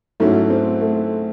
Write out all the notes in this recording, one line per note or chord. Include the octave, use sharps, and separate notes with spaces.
G#2 F#3 A3 C#4 E4
C4
A3